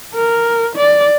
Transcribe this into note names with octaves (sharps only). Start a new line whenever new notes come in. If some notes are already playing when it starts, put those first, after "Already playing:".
A#4
D5